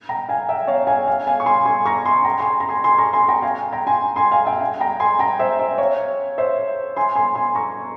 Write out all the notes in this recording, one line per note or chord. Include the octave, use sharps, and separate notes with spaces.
G5 A#5
F5 G#5
E5 G5
C#5 F5
F5 G#5
F5 G#5
F5 G#5
C#6
G#5 C6
G#5 C6
A#5 C#6
G#5 C6
G5 A#5
G#5 C6
A#5
G#5 C6
G#5 C6
A#5 C#6
G#5 C6
G5 A#5
F5 G#5
G5 A#5
G#5 C6
G#5 C6
F5 G#5
E5 G5
F5 G#5
G5 A#5
G#5 C6
G5 A#5
C5 E5
C5 E5
C#5 F5
C5 E5
G#5 C6
G#5 C6
G#5 C6
A#5 C#6